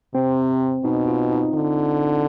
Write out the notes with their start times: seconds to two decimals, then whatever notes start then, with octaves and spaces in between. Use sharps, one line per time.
0.14 C3 C4
0.84 B2 D#4
1.08 F4
1.32 D#4
1.54 D3